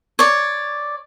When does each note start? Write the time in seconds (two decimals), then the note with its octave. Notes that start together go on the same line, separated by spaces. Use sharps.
0.19 C#5 D5